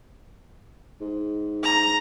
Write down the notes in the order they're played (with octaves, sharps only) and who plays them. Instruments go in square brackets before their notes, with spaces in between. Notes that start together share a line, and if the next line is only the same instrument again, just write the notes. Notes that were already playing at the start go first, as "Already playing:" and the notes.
[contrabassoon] G#2
[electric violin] A#5